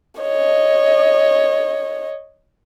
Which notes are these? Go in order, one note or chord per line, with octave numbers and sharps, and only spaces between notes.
C#5 D#5